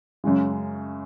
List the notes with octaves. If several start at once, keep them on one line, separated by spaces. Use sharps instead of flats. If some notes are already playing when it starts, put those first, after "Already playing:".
F#2 C#3 G#3